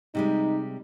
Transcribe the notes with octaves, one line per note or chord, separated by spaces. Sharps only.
C3 G3 G#3 D#4